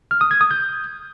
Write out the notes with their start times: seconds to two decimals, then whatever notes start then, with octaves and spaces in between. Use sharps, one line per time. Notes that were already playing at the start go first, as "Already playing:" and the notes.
0.11 F6
0.21 D#6
0.31 G#6
0.41 D#6
0.51 G6